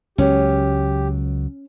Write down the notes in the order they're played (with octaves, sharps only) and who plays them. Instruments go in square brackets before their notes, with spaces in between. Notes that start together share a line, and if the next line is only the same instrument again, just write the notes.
[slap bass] C#2 F#3 [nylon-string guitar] C#4 [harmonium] G4